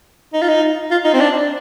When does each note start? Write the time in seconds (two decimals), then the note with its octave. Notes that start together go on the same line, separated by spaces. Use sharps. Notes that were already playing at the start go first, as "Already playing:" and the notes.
0.33 D#4
0.42 F4
0.48 D#4
0.91 F4
1.05 D#4
1.14 C4
1.20 D4